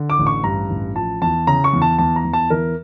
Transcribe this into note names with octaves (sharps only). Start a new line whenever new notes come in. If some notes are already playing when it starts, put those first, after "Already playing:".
Already playing: D3
D6
A1
C#6
G2 A#5
A1
F3 A5
E2 A5
C#3 A#5
C#6
E2
A5
E2 A5
A#5
E2
A5
E3 A#4